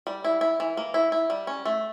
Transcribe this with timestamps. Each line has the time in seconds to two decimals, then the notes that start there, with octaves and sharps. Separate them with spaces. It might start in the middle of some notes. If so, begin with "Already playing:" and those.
0.07 G3
0.24 E4
0.41 E4
0.60 E3
0.77 A#3
0.94 E4
1.12 E4
1.30 G3
1.47 C#4
1.66 A3